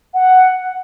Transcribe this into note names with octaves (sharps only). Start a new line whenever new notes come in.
F#5